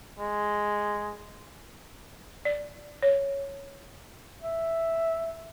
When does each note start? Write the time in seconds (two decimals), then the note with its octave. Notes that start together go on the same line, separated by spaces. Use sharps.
0.19 G#3
2.45 D5
3.03 C#5
4.42 E5